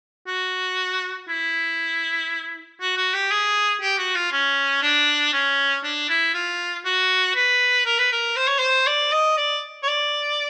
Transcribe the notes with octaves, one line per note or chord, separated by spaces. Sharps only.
F#4
E4
F#4
F#4
G4
G#4
G4
F#4
F4
C#4
D4
C#4
D4
E4
F4
F#4
B4
A#4
B4
A#4
C5
C#5
C5
D5
D#5
D5
C#5
D5